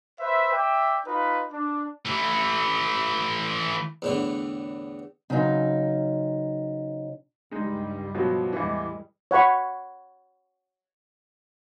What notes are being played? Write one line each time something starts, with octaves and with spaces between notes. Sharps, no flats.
B4 C5 E5
D5 E5 G5
D#4 F4 B4
D4
E3 A3
E2 A2 D3
C#3 F#3 C4 C#4 D#4
C#2 G2 G3 G#3 D#4
B2 F3 F#3
E2 A2 E3 G3 G#3
C#5 F#5 B5 C#6